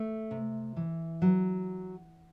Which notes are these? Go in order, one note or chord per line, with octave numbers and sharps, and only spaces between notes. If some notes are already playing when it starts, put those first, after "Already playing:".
Already playing: A3
C3
E3
F#3